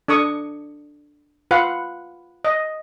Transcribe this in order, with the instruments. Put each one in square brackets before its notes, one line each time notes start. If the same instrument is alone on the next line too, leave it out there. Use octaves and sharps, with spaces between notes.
[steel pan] D4 A4 C#6 D#6
F4 B4 F5 F#5
D#5